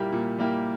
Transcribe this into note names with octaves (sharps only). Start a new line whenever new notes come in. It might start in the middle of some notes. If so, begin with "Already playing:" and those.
Already playing: A#2 G3 A#3 E4 G4
A#2
G3 A#3 E4 G4